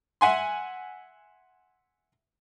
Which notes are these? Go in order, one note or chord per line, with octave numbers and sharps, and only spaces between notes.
E5 F#5 G#5 C6